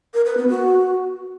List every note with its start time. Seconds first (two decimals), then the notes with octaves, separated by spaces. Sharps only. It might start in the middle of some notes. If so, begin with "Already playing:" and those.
0.14 A#4
0.25 B4
0.37 B3
0.49 F#4